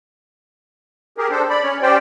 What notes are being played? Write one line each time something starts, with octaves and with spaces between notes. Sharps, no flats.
G4 G#4 A#4
D4 A4 C5
D5 B5
C#4 C#5
C#4 G4 C5 D5 G5